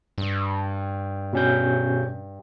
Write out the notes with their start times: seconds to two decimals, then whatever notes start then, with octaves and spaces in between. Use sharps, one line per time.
0.18 G2
1.33 B2 C#4 G6